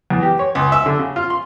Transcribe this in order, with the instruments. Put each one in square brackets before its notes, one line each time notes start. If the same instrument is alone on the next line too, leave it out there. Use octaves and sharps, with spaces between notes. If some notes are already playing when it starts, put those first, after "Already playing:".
[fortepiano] E2
G4
C#5
C#2
E5
D3
C#3
F4
C6